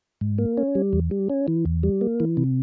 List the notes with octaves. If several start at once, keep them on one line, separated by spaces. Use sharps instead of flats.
G#2
A#3
C#4
G3
E2
G3
C#4
E3
E2
G3
A#3
E3
C3